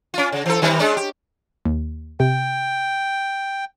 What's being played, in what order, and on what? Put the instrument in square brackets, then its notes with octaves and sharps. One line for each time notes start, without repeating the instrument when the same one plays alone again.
[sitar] C#4 F4
C#3
E3 A4
D#3 G3 C4
G#3 C#4 D4
G4
[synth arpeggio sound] D#2
[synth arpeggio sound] C3 [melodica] G5